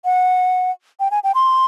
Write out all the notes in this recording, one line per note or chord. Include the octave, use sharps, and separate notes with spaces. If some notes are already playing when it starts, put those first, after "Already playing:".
F#5
G5
G#5
G5
C6